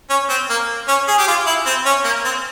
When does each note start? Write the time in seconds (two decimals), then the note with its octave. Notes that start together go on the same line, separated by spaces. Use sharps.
0.10 C#4
0.29 C4
0.50 A#3
0.88 C#4
1.08 G#4
1.18 G4
1.27 F4
1.47 E4
1.66 C4
1.86 C#4
2.05 A#3
2.25 C4